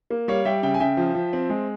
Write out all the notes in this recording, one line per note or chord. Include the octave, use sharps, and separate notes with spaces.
A#3
G3 C#5 F5
G3 E5 G5
C#3 E5 G5
G#5
C#3 E5 G5
F3
F3
C4
G#3